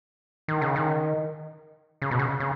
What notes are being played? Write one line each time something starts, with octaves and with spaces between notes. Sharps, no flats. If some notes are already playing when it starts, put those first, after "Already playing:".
D#3
C#3
D#3
C#3
B2
C#3
C#3